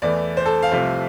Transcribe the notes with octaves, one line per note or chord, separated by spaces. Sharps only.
E2 E3 A3 D5
C5
A4
F5
C2 C3 F3 A3